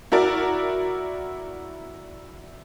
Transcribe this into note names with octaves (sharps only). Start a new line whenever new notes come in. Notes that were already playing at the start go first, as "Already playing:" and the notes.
E4 F#4 A#4 D5